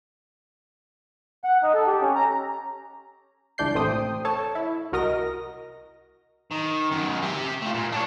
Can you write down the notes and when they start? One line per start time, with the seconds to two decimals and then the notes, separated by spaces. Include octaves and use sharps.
1.44 F#5
1.63 D#4
1.74 A4
1.87 G4
2.02 C#4
2.15 A#5
3.58 C#2 E3 D4 D5 G6 C7
3.75 A1 C3 A3 C5 G5 D#6
4.25 A4 C#5 A5
4.55 E4
4.92 C2 F#4 A#4 D#5 A#6
6.51 D#3
6.91 F#2 D#3
7.22 G4 E5
7.62 A3 F4
7.75 A#2
7.92 D4 C#5